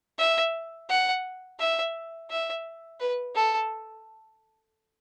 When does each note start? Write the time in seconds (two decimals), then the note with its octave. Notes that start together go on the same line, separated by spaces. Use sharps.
0.18 E5
0.89 F#5
1.59 E5
2.30 E5
3.00 B4
3.35 A4